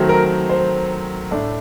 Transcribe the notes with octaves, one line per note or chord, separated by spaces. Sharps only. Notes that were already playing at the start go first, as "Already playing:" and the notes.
Already playing: D#3 F#3 A3 C4
A#4
C5
A2 A3 D4